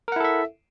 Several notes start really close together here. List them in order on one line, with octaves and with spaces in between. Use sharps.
A#4 F#5 E4 A4 E5